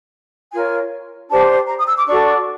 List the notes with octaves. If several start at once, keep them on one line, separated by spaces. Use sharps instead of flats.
F4 A#4 C#5 G#5
D4 G4 C5 A5
A#5
D#6
E6
D6
D4 F#4 A4 C#6